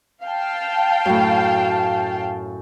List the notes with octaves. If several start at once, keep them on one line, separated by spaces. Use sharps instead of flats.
F5 G5 A5
F#2 A2